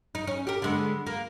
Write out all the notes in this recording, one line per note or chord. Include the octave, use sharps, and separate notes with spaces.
D#4
C#4
G4 A#4
D3 G#3 B3
A#3